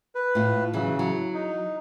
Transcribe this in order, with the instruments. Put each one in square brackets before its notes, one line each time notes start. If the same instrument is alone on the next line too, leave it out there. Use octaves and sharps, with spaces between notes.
[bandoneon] B4
[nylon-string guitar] A2 F4
[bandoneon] C#3 [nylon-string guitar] E3 F#3
[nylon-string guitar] F#3
[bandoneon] D#4